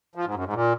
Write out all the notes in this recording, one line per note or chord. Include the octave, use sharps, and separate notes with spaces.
F3
G#2
F#2
G#2
A#2